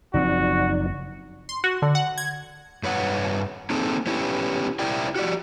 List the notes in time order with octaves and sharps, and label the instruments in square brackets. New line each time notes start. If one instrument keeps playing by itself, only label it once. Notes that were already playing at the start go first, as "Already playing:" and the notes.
[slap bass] F#1 F3 C4 [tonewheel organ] D#4 D5 [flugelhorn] F#4
[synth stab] C6
F#4
D3
F#5
G#6
[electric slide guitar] G2 B4 C#5 F#5
A#3 C4 D#4 G#4 A4
B3 C#4 E4 G4
E4 A#4 D5 E5 G5
F#4 G4 D5